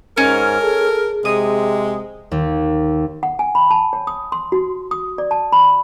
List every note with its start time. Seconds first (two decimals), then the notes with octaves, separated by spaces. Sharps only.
0.17 G#2 C#4 A#4
0.62 G#4 A4
1.25 C3 G#3 D#6
2.32 D#2
3.23 F#5
3.39 G#5
3.55 B5
3.71 A5
3.93 C#5
4.07 D#6
4.32 C6
4.52 F#4
4.91 D#6
5.18 D5
5.31 A5
5.52 B5